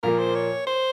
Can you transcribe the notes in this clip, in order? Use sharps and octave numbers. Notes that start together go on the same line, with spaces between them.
A#2 F3 A#3 A#4
C5
C#5
C5